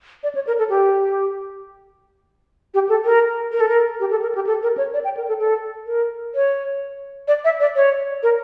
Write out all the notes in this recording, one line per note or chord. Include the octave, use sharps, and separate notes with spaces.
D5
C#5
A#4
A4
G4
G4
A4
A#4
A#4
A4
A#4
G4
A4
A#4
G4
A4
A#4
C#5
D5
G5
A#4
A4
A4
A#4
C#5
D5
E5
D5
C#5
A#4